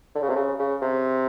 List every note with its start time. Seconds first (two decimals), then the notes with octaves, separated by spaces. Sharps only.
0.15 D3
0.22 C#3
0.29 C3
0.36 C#3
0.59 C#3
0.82 C3